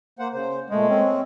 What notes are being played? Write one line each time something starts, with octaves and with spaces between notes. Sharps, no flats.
A#3 C5 F#5
C#3 C5
A#2 G#3 A3
C4 C#4